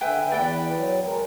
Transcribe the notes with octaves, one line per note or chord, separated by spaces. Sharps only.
D3 B4 E5 G5 G#5
E2 B4 D5 G5
F#3
G#3 A#4